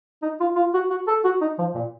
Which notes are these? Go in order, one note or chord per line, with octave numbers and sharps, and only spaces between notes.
D#4
F4
F4
F#4
F#4
A4
F#4
D#4
F3
A#2